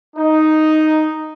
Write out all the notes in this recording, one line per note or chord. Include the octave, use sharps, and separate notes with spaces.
D#4